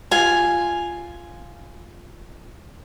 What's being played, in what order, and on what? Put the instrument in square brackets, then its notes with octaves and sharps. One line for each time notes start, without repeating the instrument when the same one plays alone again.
[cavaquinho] F4 G#5